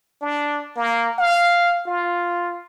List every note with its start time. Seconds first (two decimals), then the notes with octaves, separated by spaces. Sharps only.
0.21 D4
0.77 A#3
1.18 F5
1.86 F4